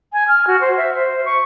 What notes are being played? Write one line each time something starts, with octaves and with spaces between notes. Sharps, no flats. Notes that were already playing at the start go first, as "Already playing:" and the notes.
G#5
F6
F#4
C5
E5
C5
C#6